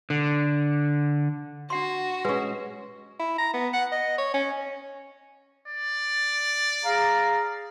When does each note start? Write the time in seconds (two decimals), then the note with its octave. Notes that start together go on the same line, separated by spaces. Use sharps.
0.10 D3
1.70 D4 F#4 F#5 C6
2.25 G#3 C#4 B4
3.19 E4
3.38 A#5
3.53 B3
3.73 F#5
3.92 D#5
4.18 C#5
4.34 C#4
5.68 D5
6.85 G#4 F5 A#5